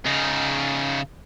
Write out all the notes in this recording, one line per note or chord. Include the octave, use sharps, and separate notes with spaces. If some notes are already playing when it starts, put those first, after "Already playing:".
C#3 D#4